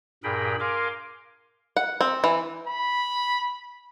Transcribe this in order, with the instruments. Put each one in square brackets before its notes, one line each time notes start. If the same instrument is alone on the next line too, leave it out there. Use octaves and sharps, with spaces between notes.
[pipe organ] G2 A#2 G#4 A#4 G5 B5
A#4 F5 G#5 C6 D6
[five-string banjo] F#5
C4
E3
[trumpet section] B5